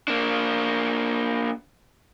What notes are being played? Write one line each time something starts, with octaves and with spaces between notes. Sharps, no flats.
A#3 D4